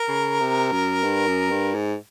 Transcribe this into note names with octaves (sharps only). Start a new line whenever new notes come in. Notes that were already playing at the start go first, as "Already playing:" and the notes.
Already playing: A#4
C#3
C3
F#2
G2
F#2
G2
G#2